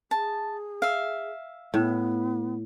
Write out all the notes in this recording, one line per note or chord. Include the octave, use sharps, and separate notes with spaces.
G#4 A5
E5 F5
A2 B3